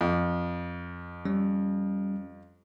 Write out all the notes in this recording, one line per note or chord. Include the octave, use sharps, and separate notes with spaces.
F2
G3 C#4